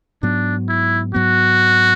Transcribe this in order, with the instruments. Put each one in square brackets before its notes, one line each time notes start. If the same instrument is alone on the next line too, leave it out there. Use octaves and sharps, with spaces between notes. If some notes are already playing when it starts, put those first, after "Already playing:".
[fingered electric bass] G#2 F#3 B3 [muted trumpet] D4
[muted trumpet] E4
[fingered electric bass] G#2 F#3 B3 [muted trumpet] F#4